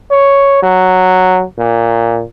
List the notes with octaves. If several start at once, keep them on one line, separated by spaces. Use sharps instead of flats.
C#5
F#3
A#2